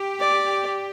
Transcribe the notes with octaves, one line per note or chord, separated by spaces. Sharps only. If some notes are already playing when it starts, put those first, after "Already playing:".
Already playing: G4
D5